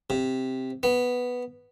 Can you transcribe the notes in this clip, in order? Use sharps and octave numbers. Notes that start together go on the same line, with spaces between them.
C3
B3